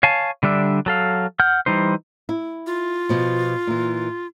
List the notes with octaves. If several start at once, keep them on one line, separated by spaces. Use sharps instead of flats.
C#5 F5 G#5 A5
D3 G3 D4 E5
F#3 A4 F5
F#5 F6 G6
E3 G3 D#4 C5
E4
F4
B2 F3
A#2 E3